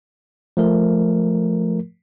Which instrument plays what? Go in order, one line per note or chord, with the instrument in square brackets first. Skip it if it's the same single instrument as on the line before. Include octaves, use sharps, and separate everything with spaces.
[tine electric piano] F3 A3 A#4